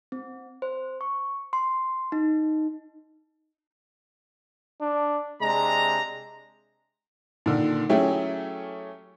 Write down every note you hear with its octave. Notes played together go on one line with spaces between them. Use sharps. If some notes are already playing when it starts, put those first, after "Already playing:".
C4
C5
C#6
C6
D#4
D4
C3 G#3 D4 A#5
A#2 D3 D#3
F#3 A3 C#4 E4 G4 G#4